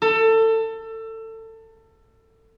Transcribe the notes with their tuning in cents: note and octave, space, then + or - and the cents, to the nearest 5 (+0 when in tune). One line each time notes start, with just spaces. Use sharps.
A4 +25